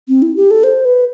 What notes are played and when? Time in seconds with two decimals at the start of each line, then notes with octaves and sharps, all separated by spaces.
0.08 C4
0.22 E4
0.36 G4
0.51 A4
0.64 C5
0.85 B4